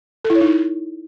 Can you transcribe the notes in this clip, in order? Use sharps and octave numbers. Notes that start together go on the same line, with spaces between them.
A4
E4
C#5
D#4
E4